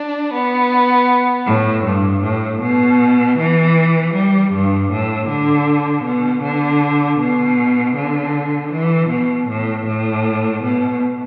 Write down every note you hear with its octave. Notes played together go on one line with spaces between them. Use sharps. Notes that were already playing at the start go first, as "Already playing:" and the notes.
Already playing: D4
B3
A2
G2
A2
B2
E3
G3
G2
A2
D3
B2
D3
B2
D3
E3
B2
A2
A2
B2